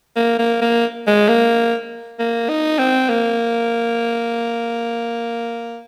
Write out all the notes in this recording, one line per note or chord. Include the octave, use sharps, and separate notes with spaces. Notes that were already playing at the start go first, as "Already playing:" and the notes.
A#3
A#3
A#3
G#3
A#3
A#3
D#4
C4
A#3